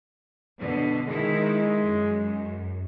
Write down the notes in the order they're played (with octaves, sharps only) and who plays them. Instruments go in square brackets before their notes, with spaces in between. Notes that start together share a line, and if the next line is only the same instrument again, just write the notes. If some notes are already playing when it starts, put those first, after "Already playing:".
[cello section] B2 D3
[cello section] D#3 D#4 E4 [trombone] G#3
[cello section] F#2